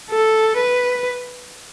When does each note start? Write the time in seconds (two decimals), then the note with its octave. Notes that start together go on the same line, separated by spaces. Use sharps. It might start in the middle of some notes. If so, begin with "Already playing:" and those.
0.10 A4
0.57 B4